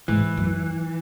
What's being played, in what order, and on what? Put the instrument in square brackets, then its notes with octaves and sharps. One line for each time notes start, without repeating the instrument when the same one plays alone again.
[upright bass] G#2 [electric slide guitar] E3
[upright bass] F#2